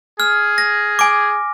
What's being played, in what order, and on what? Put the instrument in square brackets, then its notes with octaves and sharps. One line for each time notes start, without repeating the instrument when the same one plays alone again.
[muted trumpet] G#4 [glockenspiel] F6
[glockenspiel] A#6
G#5 D6